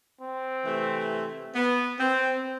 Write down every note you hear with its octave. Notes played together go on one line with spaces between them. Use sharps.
C4
C3 E3 A3
B3
C4